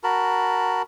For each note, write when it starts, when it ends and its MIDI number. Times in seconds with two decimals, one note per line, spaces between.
0.04 0.82 66
0.04 0.82 70
0.04 0.82 81
0.04 0.82 83